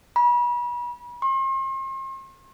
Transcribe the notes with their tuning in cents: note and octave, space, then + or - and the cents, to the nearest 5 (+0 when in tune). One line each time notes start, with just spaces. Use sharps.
B5 -35
C6 +40